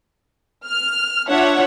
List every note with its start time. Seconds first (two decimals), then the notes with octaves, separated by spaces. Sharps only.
0.66 F6
1.29 D4 F4 C#5 E5 F#5